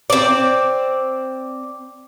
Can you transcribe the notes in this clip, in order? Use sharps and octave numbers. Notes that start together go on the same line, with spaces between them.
C4 D5